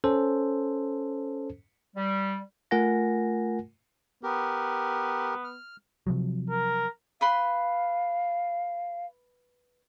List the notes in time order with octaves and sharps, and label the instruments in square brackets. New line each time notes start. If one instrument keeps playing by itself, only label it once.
[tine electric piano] C#4 A4 C5
[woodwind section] G3
[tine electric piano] A3 F4 A#4 F#5 G#5 A#6
[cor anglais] B3 [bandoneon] G4 A#4
[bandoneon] F6
[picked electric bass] C3 F3 F#3
[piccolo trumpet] A#4
[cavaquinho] B4 B5 C6 [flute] F5